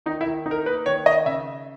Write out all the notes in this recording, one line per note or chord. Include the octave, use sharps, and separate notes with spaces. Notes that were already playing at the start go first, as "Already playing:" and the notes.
D#3 D#4
E4
D#3
D#4
A#4
A#3 B4
D#3 C#5
D#3 D#5
C#3 E5